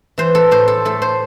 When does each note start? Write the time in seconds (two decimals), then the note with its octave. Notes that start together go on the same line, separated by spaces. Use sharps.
0.18 E3 C5
0.35 A4
0.51 A2 C5
0.68 A4
0.85 A3 A4
1.02 C5